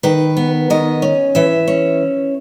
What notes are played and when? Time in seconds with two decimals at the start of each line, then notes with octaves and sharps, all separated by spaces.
0.03 D#3 B4
0.37 B3
0.70 D#3 D#5
1.02 C#4
1.35 E3 E5
1.68 C#4